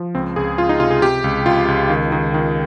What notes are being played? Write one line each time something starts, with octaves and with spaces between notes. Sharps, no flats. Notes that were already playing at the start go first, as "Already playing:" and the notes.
Already playing: F3
C#2 C4
C#2 G#4
C#2 F4
D#4
C3 F4
G#4
C3 G4
C#2
C#2 F4
C#2
D#3
D#3
D#3